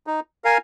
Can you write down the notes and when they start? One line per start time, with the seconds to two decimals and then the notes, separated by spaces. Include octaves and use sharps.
0.07 D#4
0.44 A#4 F5 G#5